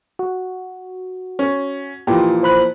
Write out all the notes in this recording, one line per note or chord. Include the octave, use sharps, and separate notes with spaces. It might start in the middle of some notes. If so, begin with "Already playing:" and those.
F#4
C#4
A#2 E3 F3 G4
C5 B5 F#6